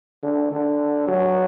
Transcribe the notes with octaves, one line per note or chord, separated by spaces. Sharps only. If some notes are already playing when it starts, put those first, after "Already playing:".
D3
D3
F#3